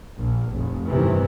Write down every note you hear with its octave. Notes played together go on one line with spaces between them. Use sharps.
A#1
F1
G1 C3 D#3 E3